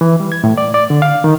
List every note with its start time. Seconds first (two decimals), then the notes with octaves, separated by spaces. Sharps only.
0.01 E3
0.20 G3
0.32 G#6
0.44 A2
0.58 D5
0.74 D5
0.90 D3
1.02 F5
1.24 D#3